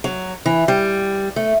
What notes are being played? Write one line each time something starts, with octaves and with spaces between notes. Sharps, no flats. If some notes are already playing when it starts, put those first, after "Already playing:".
F#3
E3
G3
A3